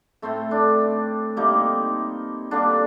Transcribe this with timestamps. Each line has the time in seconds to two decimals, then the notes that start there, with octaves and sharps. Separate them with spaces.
0.22 A2 A3 C4
0.51 D4
1.37 C3 G3 A#3 D#4
2.51 D3 G3 A#3 D4